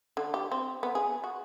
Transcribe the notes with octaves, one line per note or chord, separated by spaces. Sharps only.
D3
G4
C4
B3
G#4
F#4